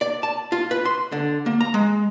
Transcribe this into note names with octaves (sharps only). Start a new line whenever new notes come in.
D5
A5
F4
B4
C6
D3
A#3
A#5
G#3